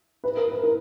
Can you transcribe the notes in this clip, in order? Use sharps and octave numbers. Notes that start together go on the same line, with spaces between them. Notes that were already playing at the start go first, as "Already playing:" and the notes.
B4
A#4
B4
A#4